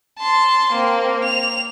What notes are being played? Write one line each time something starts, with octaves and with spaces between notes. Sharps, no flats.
A5 C6
A#3 C4
F7